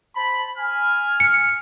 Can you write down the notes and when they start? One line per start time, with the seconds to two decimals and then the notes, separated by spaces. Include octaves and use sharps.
0.15 C5 A5 B5
0.58 G#5 F6
1.20 C#7